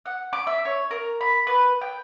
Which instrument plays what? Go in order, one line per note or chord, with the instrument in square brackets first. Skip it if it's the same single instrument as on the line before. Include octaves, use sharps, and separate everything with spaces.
[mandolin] F#5
D6
E5
C#5
A#4
B5
B4
G5